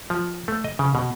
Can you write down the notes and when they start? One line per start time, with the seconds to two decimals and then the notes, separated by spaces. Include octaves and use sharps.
0.10 F3
0.48 A3
0.64 D#5
0.79 C#3
0.95 B2